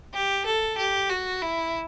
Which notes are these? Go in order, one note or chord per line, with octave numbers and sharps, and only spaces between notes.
G4
A4
G4
F#4
E4